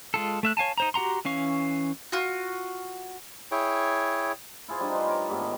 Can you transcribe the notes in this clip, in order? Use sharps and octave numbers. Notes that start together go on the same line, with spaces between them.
G#3 F4 A4
A3 E5 F#6
C#5 F5 G#5 A5
D#4 C5 A#5
F#4 G4 F#5 A#5 C6
E3 C#4 F5 C#6
F4 F#4
E4 G#4 C#5 G5
E4 F4 G#4 C5
G3 D4 D#4
B4 C5
A#4 C#5 D6
G#2 G3 A3 B3
D#3